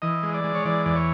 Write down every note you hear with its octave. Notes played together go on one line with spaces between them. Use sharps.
E3 D#5
G#3
D5
G#3
C#5
E3 D5
E2 D5
C#5